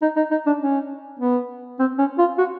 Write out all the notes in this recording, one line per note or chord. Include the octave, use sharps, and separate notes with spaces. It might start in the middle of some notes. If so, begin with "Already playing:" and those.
D#4
D#4
D#4
D4
C#4
B3
C4
C#4
F4
F#4